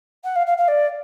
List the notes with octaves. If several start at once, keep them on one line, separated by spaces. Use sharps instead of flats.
F#5
F5
F5
F5
D5